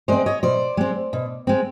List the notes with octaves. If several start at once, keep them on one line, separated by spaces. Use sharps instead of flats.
G#3 C4 C5 D5
C#5 D#5
B2 C5 D5
G#3 C4
B2
G#3 C4